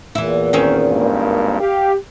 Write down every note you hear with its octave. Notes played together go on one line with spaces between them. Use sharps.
E2 A#2 E3 E4
D#3 C4 C#4
G#1 G2 A#3
G4 F5